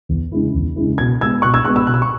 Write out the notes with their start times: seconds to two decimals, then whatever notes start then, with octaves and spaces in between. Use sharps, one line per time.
0.09 E2
0.32 C#3 G#3 E4
0.55 E2
0.76 C#3 G#3 E4
0.98 B2 G#6
1.21 G#3 B3 E6 G#6
1.42 B2 C#6 F#6
1.54 E6 G#6
1.64 G#3 B3 C#6 F#6
1.75 B5 E6
1.87 B2 F#6
1.94 E6
2.02 C#6